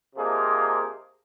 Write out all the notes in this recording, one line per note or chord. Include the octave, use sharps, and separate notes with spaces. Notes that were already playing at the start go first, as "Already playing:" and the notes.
C3 F3 A#3 D#4 G#4